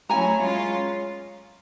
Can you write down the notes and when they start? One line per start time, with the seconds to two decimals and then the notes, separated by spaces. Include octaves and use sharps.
0.09 F#3 A3 C#4 E4 G#5 A#5
0.42 G#3 C#4 F4